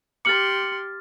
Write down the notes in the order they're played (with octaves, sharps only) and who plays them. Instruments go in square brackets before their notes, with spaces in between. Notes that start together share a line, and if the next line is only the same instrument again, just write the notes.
[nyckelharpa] G4 C6 [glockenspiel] D6 F6 A6 [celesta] C#7 F#7